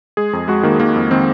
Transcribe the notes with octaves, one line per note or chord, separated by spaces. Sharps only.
G#3 G#4
F2
G#3 F#4
D#3 A#3
D#3 A#3
F2
D#3 C4